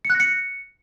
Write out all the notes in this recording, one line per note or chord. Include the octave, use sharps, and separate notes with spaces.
C#7
F#6
A#6
C#7